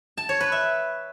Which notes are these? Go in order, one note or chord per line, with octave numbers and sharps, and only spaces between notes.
A5
C#5
B4
E5